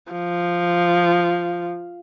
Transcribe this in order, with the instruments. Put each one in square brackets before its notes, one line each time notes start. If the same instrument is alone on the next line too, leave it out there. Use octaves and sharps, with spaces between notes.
[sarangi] F3